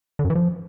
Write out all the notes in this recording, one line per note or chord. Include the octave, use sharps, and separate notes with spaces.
D3
F#2
E3
F3